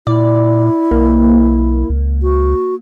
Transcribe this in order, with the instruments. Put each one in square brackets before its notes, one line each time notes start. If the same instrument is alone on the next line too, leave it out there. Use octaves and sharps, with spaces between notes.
[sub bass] A#2 [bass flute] E4 [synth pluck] D5
[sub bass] B1 [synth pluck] A#3
[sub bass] C#2
[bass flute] F#4